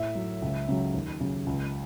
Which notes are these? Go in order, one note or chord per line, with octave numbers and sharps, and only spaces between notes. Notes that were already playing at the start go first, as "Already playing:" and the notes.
Already playing: A2 E5
F#3
C#2
C#3 F#3
D#2
C#3 F#3
C#2